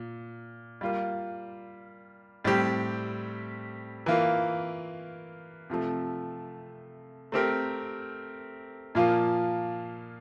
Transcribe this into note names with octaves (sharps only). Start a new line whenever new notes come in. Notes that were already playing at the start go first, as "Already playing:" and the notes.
Already playing: A#2
G3 A#3 F4
A2 G3 C4 G4
E3 A#3 F4
C3 F3 A3
A3 C4 G4 A#4
A#2 F3 A#3 F4